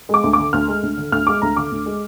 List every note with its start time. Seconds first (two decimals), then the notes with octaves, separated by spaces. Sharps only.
0.09 G#3 D6
0.24 D2
0.33 D3 D6
0.53 D2 F6
0.68 G#3
0.83 D2
0.97 D3
1.12 D2 F6
1.27 G#3 D6
1.42 D2 A#5
1.57 D3 D6
1.71 D2
1.86 G#3